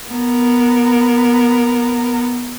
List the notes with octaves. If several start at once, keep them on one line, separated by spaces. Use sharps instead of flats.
B3 A#4